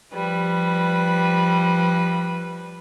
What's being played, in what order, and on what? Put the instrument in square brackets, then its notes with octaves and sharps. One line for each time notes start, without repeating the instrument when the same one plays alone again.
[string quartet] F3 G3 B4